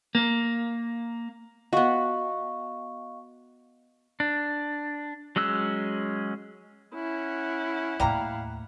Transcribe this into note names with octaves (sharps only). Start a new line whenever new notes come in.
A#3
B3 F#4 D#5 F5 C#6
D4
F#3 G#3 C#4 E6 F#6
C#4 E4 F#5
D#2 A2 G3 F5 A#5